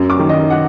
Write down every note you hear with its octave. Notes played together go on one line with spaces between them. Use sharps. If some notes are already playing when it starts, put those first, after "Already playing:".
Already playing: F#2
D6
D#3
D#5
F#5